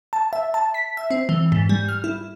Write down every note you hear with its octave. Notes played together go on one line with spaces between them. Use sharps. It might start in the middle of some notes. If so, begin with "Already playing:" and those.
A5
E5
A5
B6
E5
C4
E3
G#2
G3
F6
E4